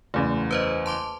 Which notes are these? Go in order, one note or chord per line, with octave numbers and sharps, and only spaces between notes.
F#1 E2 C#3 A3
B4 C5 D#5
A5 C6 D6